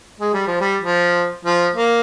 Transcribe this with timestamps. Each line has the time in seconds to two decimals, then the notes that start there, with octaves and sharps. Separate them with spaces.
0.20 G#3
0.34 G3
0.47 F3
0.61 G3
0.82 F3
1.45 F3
1.75 A#3